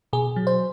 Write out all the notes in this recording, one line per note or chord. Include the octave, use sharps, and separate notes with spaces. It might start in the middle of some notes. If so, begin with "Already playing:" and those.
B2 G#4
F#3
C5